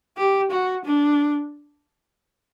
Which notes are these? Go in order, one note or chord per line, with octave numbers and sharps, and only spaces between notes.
G4
F#4
D4